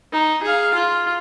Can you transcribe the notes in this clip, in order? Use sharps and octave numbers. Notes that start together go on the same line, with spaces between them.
D#4
G#4 F5
F4